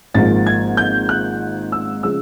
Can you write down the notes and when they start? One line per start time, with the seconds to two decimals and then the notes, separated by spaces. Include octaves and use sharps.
0.14 G#1 G#2 F3 A#3 A6
0.46 G#6
0.77 G6
1.09 F#6
1.72 E6
2.03 C#3 F3 G#3 E6